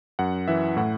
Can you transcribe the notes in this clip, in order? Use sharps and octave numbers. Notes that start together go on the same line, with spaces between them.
F#2 F#5
E3 E5
A2 F#5